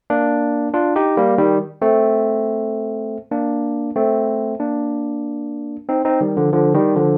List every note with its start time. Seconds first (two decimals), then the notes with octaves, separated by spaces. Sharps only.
0.10 A#3 D4
0.74 D4 F4
0.96 D#4 G4
1.17 G3 A#3
1.38 D#3 G3
1.82 A3 C4
3.31 A#3 D4
3.96 A3 C4
4.60 A#3 D4
5.89 C4 D#4
6.05 C4 D#4
6.21 D#3 G3
6.37 D3 F3
6.53 D3 F3
6.74 D#3 G3
6.96 D3 F3